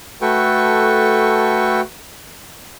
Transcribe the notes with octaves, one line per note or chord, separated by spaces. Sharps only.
A3 F#4 A4 B4 G5 C#6